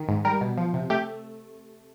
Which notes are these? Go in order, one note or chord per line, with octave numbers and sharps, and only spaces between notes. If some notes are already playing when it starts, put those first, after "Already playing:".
Already playing: D#3
G#2
G3 A#4
B2
F3
C3
A3 G4